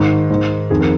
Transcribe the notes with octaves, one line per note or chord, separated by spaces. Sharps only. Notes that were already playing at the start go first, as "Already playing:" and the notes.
Already playing: G#2 D#3
G#2 D#3
F2 D#3 G#4
A#4